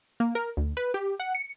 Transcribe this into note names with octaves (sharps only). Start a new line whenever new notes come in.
A#3
A#4
D2
B4
G4
F#5
C#7